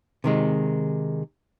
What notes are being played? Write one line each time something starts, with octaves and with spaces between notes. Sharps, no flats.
C3 D#3 G#3